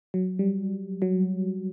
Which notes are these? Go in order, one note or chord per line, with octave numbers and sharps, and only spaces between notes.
F#3
G3
F#3